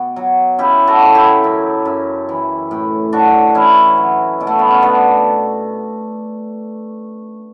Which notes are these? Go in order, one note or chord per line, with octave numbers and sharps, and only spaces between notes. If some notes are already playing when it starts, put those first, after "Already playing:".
Already playing: B2 G4
F#3
C#3 E4 G4
F#4 A4
F#3
E4 G4
F#2
F#2
E3
A2
A2 D4 F#4
E3 C#4 E4
F#3
B2
A3
B3
C#4
B2 B3 D4